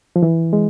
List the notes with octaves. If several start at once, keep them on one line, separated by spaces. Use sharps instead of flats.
F3
E3
G#3